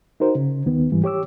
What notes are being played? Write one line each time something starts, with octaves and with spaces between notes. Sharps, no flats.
D#4 F#4 A#4 C5
C#3
D#2 D#3 B3
G#2 E3 G3
G4 C#5 D6 E6